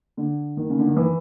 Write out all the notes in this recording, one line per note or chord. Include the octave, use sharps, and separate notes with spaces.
D3
D#3
C#3
D3
D#3
E3